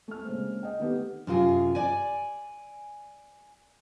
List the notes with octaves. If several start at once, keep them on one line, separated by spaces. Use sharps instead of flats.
A3 F6
C#3 G#3 A#3 C4
D#5 F#5 G5
D#3 A3 B3 G4
F#2 C3 F4 G#4
D5 G#5